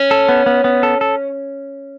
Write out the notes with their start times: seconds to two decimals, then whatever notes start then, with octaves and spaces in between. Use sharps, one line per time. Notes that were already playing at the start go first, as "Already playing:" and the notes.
Already playing: C#4
0.11 A4
0.29 B3
0.46 B3
0.64 B3
0.83 A4
1.01 A4